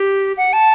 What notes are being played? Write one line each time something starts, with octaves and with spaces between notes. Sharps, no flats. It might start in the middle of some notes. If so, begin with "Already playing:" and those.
Already playing: G4
F#5
A5